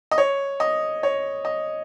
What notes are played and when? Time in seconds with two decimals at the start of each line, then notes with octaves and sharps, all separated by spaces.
0.11 D#5
0.18 C#5
0.60 D#5
1.03 C#5
1.45 D#5